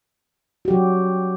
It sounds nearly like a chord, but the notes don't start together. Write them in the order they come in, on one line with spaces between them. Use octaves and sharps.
F#4 G4 F#3